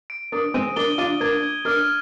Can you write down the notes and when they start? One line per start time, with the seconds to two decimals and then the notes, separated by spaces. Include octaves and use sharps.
0.10 D7
0.32 A#3 D4 D#6
0.54 G#3 C4 D#7
0.76 A#3 D4 G7
0.98 D4 F4 D#7
1.20 A#3 D4 G#6
1.43 G#6
1.65 A#3 D4 F6